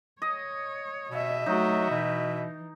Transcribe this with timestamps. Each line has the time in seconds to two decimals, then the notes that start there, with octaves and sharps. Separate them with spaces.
0.22 C#5 D#5
1.10 B2 D#5 E5
1.46 F#3 A3 D#4 F#4
1.90 B2 E3